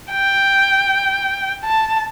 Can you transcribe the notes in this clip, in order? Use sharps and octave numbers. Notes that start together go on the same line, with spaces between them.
G5
A5